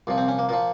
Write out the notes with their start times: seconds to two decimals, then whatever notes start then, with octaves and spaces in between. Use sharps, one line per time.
0.07 C2 A#2 F3
0.18 C4
0.28 C#4
0.39 A#3
0.49 A#2 F3 A#3